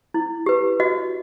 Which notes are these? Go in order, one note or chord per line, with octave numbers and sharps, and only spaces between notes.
E4
G4 B4
F#4 D#5